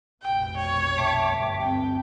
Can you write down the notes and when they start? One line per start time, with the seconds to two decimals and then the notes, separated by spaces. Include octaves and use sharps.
0.22 F1 A#1 B2 G5
0.58 C#5
0.98 E5 G5 A5 D6
1.29 G1 D2 G2
1.62 C4 G5